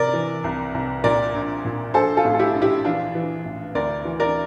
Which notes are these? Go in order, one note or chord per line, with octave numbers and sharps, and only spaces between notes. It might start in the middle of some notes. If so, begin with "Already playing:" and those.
Already playing: C3 A#4 D5
E3
C2
C2
A#2 A#4 D5
A#1
A#2
A#1 A4 C5
F4 A4
A2
A4
E4 G4
A#1
E4 G4
E3 D4 F4
E3
A1
D2 A#4 D5
E3
A#4 D5